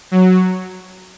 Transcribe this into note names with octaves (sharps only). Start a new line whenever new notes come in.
F#3